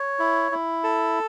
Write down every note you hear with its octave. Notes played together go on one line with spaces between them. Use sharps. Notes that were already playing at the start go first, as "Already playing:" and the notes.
Already playing: C#5
E4
E4
A4